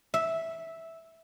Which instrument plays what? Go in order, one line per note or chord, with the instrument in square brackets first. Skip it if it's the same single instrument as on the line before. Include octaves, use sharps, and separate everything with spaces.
[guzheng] E5